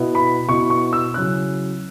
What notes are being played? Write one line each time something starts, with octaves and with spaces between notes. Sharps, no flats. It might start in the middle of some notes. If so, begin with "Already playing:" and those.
Already playing: B2 B3 E4
B5
B2 B3 E4 C#6
C#6
E6
C#3 F#3 C#4 E4 F#6